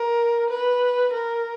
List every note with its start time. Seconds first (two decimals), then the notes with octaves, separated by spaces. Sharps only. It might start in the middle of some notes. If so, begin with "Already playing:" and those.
Already playing: A#4
0.50 B4
1.13 A#4